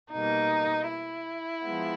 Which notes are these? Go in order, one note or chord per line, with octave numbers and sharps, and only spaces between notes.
B2 G3 A#3 D#4
E4
F3 G#3 B3